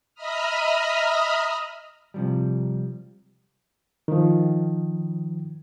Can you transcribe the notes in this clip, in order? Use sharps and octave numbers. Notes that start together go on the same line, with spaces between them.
D#5 E5 A#5 B5 D#6 F6
C3 F3 G3
D#3 F3